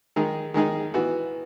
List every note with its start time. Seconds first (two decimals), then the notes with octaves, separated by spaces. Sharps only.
0.16 D#3 G#3 D#4 G#4
0.54 D#3 G#3 D#4 G#4
0.94 E3 B3 F#4